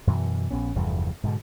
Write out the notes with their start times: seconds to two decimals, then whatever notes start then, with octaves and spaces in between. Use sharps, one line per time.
0.07 F#2 B2 E3
0.51 A#1 B3 C#4
0.76 F1 E2 G2 G3
1.23 G#2 B2 D3